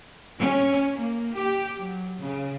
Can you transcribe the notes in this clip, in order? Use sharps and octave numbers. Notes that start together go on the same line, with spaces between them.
C#4
A#3
G4
F#3
C#3